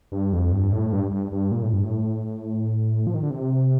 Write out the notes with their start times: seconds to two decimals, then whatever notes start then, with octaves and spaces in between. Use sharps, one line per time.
0.12 G2
0.33 F2
0.52 G2
0.72 A2
0.92 G2
1.11 G2
1.32 G2
1.51 A#2
1.63 A2
1.73 G2
1.84 A2
3.07 F3
3.14 D#3
3.23 D3
3.30 C3